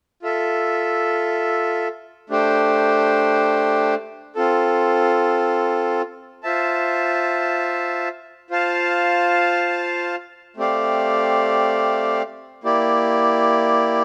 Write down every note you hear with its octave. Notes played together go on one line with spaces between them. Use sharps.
F4 A4 E5
A3 D4 G4 C5 G5
C4 F4 A4
F4 C5 E5 A5
F4 C5 F5 A5
A3 C4 G4 D5 F5
A#3 E4 G4 D5